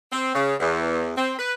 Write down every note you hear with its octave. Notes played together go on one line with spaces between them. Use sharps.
C4
C#3
E2
C4
B4